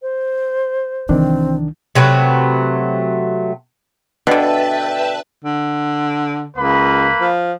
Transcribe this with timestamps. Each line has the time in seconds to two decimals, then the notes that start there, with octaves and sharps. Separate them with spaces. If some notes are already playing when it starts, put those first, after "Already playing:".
0.02 C5
1.09 C2 D#3 E3 C4 D4
1.95 C3 F#3 A3 B4
4.27 B2 D3 D4 B4 E5 G5 A5
5.44 D3
6.57 C#2 A#3 B4 B5
7.21 F3